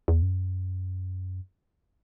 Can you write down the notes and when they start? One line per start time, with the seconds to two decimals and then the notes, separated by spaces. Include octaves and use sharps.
0.08 E2
0.22 F#2